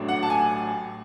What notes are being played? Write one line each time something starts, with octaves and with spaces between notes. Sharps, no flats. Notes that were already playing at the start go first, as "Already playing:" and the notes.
Already playing: A1 A2 F#3 A3 D4
F#5
A5
G#5